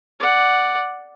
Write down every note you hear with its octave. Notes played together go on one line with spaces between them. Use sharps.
D5 F#5